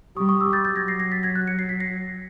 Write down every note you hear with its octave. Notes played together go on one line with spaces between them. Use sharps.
G3 C#6 D#6
C#6 D#6
D6 E6
G6 A6
F#3 G6 A6
G#6 A#6
A#6 C7
A#6 C7
A6 B6
G#6 A#6
F#6 G#6
C#7
C7
B6
A#6 C7